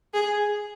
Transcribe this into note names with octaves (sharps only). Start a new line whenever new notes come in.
G#4